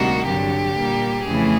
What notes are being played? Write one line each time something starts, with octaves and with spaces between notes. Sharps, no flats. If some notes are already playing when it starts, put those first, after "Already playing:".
Already playing: D2 C3 D#3 G3 A#3 F#4
G2 D3 F#3 G4
A#2 G3 A#3
F2 C#3 E3 A3 G#4